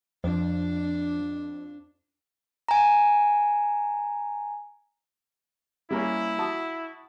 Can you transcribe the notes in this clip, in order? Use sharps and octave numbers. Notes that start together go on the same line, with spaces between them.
F2 F3 D4
G#5 A#5
G3 A#3 C#4 E4
F#4 A5 D#6